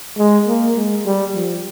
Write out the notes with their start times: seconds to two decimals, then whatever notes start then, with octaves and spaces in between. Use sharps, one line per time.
0.18 G#3
0.48 A#3
0.76 G#3
1.06 G3
1.35 F3